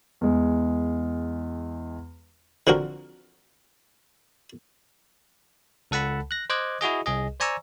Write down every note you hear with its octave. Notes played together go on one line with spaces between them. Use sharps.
E2 G#3
D3 F3 C4 F#4 A#4
C#2 A4 F#5 A5 B5
F#6 A#6
C5 D#5 D6 F#6 G#6
E4 F#4 G#4 D#5
C2 G#4 D#5
C5 D5 G#5 A#5 C#6 E6